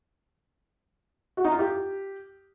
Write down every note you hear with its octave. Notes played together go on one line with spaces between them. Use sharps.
F#4
D#4
F4
G4